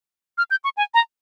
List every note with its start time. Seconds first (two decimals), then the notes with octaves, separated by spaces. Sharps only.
0.38 F6
0.51 G6
0.64 C#6
0.77 G#5
0.94 A#5